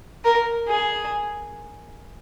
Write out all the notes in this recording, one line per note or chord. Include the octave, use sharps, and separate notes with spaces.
A#4
G#4